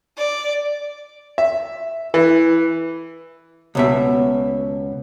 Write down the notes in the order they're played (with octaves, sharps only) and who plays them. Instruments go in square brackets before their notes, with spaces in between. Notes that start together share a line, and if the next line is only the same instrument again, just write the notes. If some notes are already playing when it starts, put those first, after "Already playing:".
[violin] D5
[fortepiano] E5
E3
[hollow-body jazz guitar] C#2 B2 E5